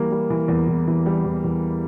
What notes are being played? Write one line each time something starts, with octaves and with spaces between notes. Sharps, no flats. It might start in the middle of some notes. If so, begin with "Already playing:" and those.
Already playing: E3 G3 A#3
G3
E3
E2
E2
E3
G3
E2
E2